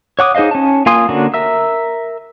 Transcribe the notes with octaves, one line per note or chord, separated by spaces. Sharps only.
C#5 F#5 D6 D#6
D#4 G#4 C5 D#5 F5
C#4 A5
A#3 F4 G#5 C6 D#6
D3 A#3 C#4 D4 F#4
A#4 E5 E6